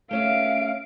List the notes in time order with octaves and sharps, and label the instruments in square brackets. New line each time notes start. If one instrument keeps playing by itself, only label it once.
[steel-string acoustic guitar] A3 C#4 E5 [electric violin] F5 D7